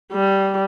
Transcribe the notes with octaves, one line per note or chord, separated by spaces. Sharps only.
G3